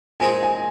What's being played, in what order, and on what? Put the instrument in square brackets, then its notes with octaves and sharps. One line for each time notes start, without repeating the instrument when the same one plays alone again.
[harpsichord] A#2 G#3 C4 D#4 G#4 [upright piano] G#5
[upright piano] G#5